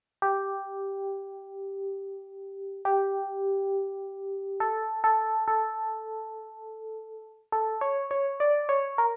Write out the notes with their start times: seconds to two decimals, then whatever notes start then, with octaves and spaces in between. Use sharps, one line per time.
0.22 G4
2.85 G4
4.60 A4
5.04 A4
5.48 A4
7.52 A4
7.81 C#5
8.11 C#5
8.40 D5
8.69 C#5
8.98 A#4